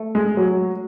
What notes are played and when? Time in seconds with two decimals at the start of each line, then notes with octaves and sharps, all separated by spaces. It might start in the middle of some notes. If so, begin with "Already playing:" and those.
Already playing: A3
0.15 G#3
0.37 F#3